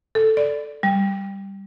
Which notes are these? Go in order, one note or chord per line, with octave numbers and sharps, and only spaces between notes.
A4
D5
G3